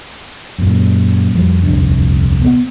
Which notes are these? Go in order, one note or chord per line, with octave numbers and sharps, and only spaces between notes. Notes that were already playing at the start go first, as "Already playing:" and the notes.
F#2 A#2
F2 F3 G3
D#1 C2 F2 D4
B3